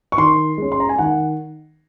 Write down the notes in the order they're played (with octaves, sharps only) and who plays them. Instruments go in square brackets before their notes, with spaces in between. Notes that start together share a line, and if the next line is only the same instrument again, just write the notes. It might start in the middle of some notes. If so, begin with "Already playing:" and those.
[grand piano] C#6
D#3 C6
G#3 C#4
C6
A#5
G#5
D#3 F#5